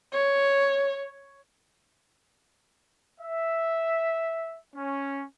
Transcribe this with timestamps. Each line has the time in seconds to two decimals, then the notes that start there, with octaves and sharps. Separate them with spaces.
0.12 C#5
3.20 E5
4.74 C#4